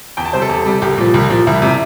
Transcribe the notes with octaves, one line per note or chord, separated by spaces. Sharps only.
E2 G5
A5
C3 G3 C5
A4
E2
C3 G3
C2 G4
A#2 F3
C2
A#2 F3
C2 E4
C3 G3